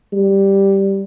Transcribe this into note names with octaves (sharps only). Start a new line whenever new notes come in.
G3